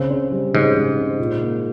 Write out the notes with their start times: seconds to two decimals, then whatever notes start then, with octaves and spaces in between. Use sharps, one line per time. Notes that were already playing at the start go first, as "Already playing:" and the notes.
Already playing: C#3 C4
0.10 C4
0.32 G3
0.54 G#2 C#3
0.76 C#3
0.97 C4
1.19 A#2
1.41 A#3